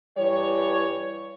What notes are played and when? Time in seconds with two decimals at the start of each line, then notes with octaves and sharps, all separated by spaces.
0.18 G2 E3 G3 C#5